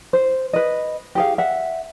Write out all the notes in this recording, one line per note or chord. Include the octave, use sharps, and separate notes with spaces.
C5
B4 D#5
G4 G#4 F5
E5 F#5